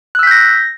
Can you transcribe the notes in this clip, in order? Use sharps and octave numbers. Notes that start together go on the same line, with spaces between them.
E6 F#6 G6 A#6 B6